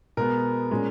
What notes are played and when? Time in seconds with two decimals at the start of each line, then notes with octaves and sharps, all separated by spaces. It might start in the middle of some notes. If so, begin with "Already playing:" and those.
0.17 B2 G#3 B3 A#4
0.71 A#2 G#3 C#4